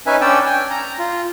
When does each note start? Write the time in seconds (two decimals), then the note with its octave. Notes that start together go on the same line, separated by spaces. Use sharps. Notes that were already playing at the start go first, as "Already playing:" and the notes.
0.06 C#4 D#4 B4 E5 G#5
0.21 C#4 D4 D5 G5 E6
0.46 G5 G#5
0.70 A#5
0.99 F4